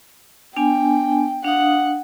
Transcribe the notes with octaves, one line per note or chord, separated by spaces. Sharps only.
B3 D4 G5 G#5
D4 F5 F#5 D#6